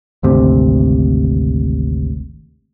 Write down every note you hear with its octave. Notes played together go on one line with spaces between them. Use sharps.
G#1 D2 C3